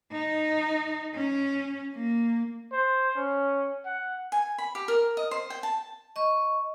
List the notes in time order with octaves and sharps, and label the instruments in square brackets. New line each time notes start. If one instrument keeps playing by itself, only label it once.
[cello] D#4
C#4
A#3
[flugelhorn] C5
C#4
F#5
[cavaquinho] G#5
B5
G4
A#4
D#5
C5
G5
A5
[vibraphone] D#5 C#6